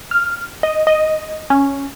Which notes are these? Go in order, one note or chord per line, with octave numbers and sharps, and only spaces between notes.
F6
D#5
D#5
C#4